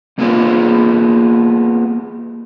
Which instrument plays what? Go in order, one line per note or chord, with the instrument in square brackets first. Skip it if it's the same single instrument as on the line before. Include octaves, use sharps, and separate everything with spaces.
[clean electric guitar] G#3 A#3 B3 F4 G#4